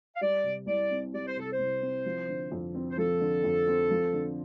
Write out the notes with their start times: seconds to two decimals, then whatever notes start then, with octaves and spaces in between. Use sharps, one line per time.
0.15 F5
0.21 G3 D5
0.44 C3
0.66 C2 D5
0.90 C4
1.13 G3 D5
1.27 C5
1.37 C3 A4
1.53 C5
1.59 C2
1.82 C4
2.06 F3
2.29 D3
2.52 F2
2.75 C4
2.90 C5
2.98 F3 A4
3.20 D3
3.44 F2
3.67 C4
3.91 F3
4.13 D3